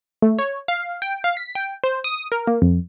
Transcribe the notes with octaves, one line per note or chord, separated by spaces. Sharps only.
A3
C#5
F5
G5
F5
B6
G5
C5
D#6
A#4
A#3
F2